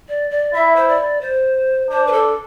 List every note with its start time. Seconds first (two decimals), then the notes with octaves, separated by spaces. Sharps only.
0.09 D5
0.30 D5
0.54 E4 E5
0.76 C5
0.88 D5
1.21 C5
1.90 D4 C5
2.07 B4
2.12 A4